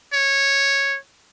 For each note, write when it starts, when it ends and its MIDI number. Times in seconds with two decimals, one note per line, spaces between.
0.13 0.98 73